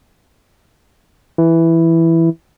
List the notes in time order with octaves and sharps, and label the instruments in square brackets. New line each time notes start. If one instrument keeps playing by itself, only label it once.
[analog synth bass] E3